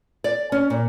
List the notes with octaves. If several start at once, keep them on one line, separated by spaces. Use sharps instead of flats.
D5
C#4
A#2